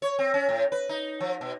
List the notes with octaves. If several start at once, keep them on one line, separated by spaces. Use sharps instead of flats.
C#5
C4
C#4
A2
B4
D#4
F3
B2